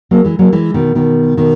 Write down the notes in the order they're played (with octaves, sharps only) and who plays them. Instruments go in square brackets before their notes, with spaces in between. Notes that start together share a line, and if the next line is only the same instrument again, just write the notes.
[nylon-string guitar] F#3 A#3
E3 G#3
F#3 A#3
E3 G#3
B2 D#3
B2 D#3
B2 D#3